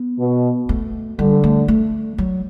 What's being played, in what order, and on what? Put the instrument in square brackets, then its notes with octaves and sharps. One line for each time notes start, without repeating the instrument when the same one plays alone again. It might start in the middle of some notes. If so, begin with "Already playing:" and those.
Already playing: [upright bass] B3
[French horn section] B2
[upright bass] A3
[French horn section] D3 [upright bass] G3
[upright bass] A3
A3
F#3